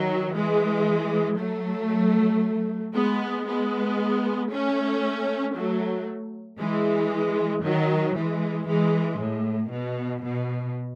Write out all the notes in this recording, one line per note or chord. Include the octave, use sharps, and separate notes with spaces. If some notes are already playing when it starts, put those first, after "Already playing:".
Already playing: D#3 F#3
E3 G#3
F#3 A3
G#3 B3
G#3 B3
A3 C#4
F#3 A3
E3 G#3
D#3 F#3
E3 G#3
E3 G#3
A2
B2
B2